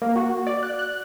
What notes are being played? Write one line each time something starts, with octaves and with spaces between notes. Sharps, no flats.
A#3
F#4
D5
F#6
F#6